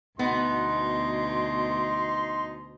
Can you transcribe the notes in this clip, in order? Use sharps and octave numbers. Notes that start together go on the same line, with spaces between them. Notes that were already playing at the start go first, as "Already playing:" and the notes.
D2 B2 B3 D#4 C6